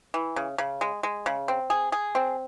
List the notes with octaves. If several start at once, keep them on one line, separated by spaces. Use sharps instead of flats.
E3
C#3
C#3
G#3
G#3
C#3
C4
G#4
G#4
C4